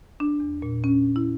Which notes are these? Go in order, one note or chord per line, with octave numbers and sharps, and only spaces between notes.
D4
E2
A#2
C#4
E4